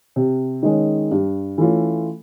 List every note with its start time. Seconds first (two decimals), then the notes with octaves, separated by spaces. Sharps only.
0.16 C3
0.63 D#3 G#3 C#4
1.11 G2
1.58 E3 A3 C#4 F4